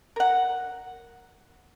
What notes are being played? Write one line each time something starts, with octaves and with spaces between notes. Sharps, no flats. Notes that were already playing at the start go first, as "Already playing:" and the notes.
A#4 F#5